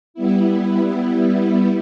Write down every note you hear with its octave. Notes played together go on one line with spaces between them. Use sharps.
G3 B3 E4